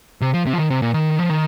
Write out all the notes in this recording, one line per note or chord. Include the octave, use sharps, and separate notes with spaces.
C3
F3
C3
F3
D#3
C3
A#2
D#3
F3
D#3